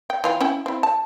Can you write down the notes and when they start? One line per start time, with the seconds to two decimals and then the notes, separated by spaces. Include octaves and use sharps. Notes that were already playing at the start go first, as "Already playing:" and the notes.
0.10 G5
0.24 E3 F4 G5
0.41 C#4 E4 G5
0.66 C4 E4
0.83 A5